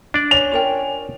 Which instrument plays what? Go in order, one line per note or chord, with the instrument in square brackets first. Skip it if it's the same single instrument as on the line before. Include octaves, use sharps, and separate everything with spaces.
[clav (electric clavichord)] D4 D5
[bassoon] C#4 [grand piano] F7
[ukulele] F4 A#4 G5